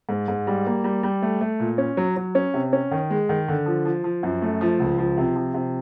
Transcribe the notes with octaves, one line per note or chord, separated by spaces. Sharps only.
G#2
G#2
G3
A#3
G3
G3
A3
A3
A#2
C#4
F#3
F#3
C#4
C3
C#4
D#3
G#3
D#3
D3
F3
F3
F3
F#2
A3
F3
C#2
F3
C3
F3
C3